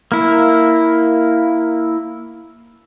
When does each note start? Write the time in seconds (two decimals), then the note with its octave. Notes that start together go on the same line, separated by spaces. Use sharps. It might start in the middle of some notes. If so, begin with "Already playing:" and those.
0.12 A#3 E4